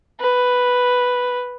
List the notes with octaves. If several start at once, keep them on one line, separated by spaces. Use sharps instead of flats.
B4